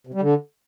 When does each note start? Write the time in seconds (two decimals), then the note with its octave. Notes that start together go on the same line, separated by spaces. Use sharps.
0.07 C3
0.14 G3
0.21 D3